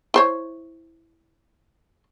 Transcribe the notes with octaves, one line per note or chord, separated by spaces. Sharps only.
E4 C5 C#5